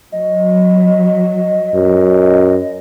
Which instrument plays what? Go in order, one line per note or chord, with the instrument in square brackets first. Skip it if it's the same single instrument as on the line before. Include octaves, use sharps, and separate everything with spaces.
[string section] F#3 [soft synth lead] D#5
[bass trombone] F#2